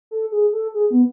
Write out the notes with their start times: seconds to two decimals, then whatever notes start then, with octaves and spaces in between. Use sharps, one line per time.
0.11 A4
0.32 G#4
0.53 A4
0.74 G#4
0.91 B3